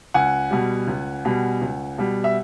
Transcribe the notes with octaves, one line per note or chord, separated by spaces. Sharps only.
C#2 F#5 G#5
B2 G3
C#2
B2 G3
C#2
B2 G3
E5